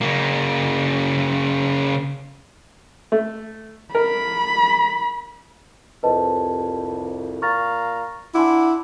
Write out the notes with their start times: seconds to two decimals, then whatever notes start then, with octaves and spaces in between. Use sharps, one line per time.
0.01 C#3 A#3
3.12 A3
3.95 A#4 B5
6.03 C2 F2 B4 D#5 A5
7.42 A#2 F5 A#5 C#6 F6 A6
8.35 D4 E4 F#5 G#5 C6 D6